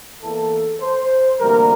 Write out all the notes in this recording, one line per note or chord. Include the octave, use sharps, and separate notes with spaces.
E2 E3 A#3 A4
C5
D2 C3 E3 G3 A#3 A#4